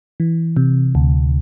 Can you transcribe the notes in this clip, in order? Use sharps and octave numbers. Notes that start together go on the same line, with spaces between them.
E3
C3
D2